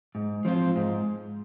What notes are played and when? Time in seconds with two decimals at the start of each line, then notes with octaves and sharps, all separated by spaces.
0.15 G#2
0.45 F3 C4 F4
0.76 G#2